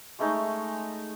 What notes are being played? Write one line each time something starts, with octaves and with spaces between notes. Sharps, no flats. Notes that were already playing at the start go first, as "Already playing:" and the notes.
G#3 A3 C#4 D#4